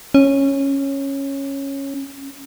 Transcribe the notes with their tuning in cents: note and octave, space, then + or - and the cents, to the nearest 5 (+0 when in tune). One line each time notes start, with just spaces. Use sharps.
C#4 -10